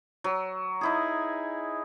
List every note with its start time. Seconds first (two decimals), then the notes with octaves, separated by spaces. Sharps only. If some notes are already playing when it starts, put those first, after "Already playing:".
0.24 F#3
0.81 D#4 E4 G#4